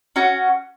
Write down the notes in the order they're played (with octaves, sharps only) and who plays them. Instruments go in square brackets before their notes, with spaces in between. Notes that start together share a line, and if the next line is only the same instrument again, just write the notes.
[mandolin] C#4 F#4